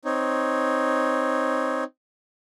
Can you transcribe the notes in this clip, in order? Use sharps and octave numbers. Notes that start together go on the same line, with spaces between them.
C4 D#4 C#5